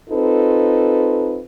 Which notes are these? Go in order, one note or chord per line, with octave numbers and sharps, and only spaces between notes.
C4 D#4 F4 A4 B4